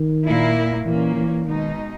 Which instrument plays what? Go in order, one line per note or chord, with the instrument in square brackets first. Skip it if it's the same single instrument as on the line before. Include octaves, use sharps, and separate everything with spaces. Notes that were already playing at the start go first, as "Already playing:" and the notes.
Already playing: [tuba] D#3
[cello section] A#2 A#3 E4
[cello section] A#2 A#3 C#4 [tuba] E3
[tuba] E3
[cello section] B2 G#3 D#4 [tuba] D#3